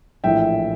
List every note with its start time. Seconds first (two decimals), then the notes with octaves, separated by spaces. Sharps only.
0.24 A#1 A2 E3 E5 G5